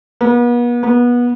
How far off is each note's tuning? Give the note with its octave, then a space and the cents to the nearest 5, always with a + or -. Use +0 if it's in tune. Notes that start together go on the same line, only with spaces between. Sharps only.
B3 -40
B3 -25